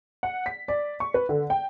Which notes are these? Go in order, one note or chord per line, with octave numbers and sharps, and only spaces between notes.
F#5
B6
D5
C#6
B4
D3
G5